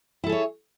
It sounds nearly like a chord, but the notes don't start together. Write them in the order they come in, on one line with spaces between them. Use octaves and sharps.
E4 A4 G#4 C#5